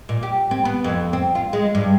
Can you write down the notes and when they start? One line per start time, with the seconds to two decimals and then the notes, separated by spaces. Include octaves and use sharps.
0.09 A#2
0.23 G4
0.51 C4
0.65 B3
0.84 F2
1.13 C4
1.35 F4
1.53 G#3
1.75 G2